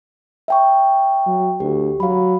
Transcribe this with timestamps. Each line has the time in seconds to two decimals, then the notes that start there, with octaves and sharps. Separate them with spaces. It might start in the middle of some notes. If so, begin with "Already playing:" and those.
0.48 E5 G5 C#6
1.26 F#3
1.60 D2 G4
2.00 F#3 F5 B5